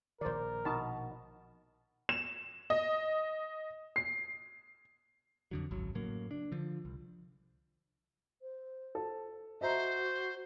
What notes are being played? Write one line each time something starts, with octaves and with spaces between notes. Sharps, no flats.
A#1 D#3 A#4 C5 D5
B2 D#4 A5
E7
D#5
C7
F2 D3 F#3
G#1 C#2 F#2 F#3
A2 C#3 F#3 A#3
D4
D3 F3
C2
C5
A4
F#4 C5 D#5 E5 A#5